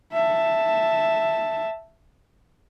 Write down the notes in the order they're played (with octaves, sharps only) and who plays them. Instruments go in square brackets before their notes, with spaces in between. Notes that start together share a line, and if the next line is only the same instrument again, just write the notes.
[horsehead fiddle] E5 A5